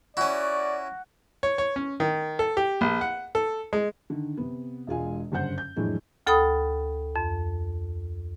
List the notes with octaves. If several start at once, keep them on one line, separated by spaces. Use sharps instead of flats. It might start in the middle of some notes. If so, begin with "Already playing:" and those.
C#4 E4 F#4 D5
C#5
C#5
C#4
D#3
A4
G4
A#1
F#5
A4
G#3
D3 D#3
C3 B3
E1 G#3 F4 G#5
F#1 G2 D3 C5 F#5 G6
G6
F2 A2 E3 F#3 G#3 D4
D2 A4 G5 B5 D#6
F2